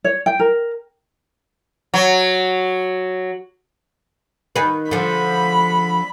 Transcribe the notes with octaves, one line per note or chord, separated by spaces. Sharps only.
C#5
G5
A#4
F#3
D#3 B4
D3 F3 B5